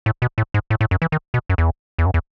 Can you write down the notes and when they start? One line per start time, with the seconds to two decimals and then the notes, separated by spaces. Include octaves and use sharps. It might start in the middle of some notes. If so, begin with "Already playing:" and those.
0.06 A2
0.22 B2
0.38 A2
0.54 G#2
0.70 A2
0.81 A2
0.91 F#2
1.02 E3
1.12 D#3
1.34 B2
1.50 F#2
1.58 E2
1.99 E2
2.06 F#2
2.14 E2